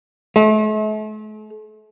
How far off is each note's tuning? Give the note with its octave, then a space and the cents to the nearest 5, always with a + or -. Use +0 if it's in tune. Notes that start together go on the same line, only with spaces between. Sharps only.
A3 -40